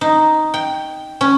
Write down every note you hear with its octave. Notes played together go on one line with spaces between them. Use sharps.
D#4
G5
C#4